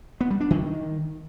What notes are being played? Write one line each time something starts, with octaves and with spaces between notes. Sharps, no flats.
B3
G3
D4
D#3